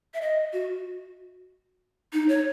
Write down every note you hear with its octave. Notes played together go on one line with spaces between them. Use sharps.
E5
D#5
F#4
D#4
C#5